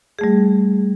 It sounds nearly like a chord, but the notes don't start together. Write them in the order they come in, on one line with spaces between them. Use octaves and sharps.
G#4 A3 G3